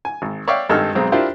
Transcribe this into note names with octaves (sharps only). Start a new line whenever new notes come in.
G#5
G#1
C#5 D5 E5 F5 G5
G#1 G2 D#4 A4 E6 F6
B1 G#3 C4 A#5
D4 E4 F4 G4 A#4 C5